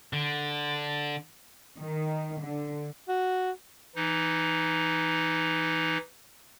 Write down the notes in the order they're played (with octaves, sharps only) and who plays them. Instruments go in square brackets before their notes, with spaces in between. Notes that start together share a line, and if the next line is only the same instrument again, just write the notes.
[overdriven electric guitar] D3
[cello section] D#3
D3
[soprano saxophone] F#4
[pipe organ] E3 D#4